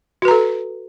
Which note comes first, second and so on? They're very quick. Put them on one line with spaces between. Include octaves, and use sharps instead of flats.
F#4 B4 A#5 A4